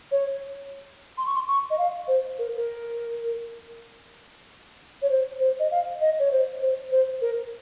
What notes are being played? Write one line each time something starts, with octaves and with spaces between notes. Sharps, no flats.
C#5
C6
C#6
C6
C#6
D#5
F5
C5
A#4
A#4
C#5
C5
C5
D#5
F5
D#5
C#5
C5
C5
C5
A#4